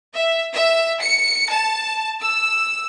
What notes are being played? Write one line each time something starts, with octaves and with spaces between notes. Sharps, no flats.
E5
E5
C#7
A5
E6